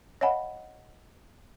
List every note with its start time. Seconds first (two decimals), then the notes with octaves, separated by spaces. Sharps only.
0.21 C#5 D#5 F5 F#5 G#5 B5